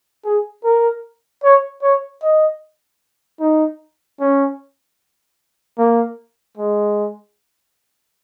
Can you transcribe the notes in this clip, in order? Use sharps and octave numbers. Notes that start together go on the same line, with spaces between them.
G#4
A#4
C#5
C#5
D#5
D#4
C#4
A#3
G#3